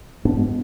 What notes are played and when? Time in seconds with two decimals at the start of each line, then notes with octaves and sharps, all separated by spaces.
0.25 G#2 B3 D4
0.37 G#3 B3